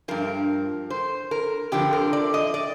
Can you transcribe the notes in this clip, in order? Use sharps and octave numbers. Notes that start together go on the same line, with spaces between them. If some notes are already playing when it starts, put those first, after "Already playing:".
G2 F3 A#4
C5
A#4
F2 D3 F3 G4
A#4
D5
D#5
D5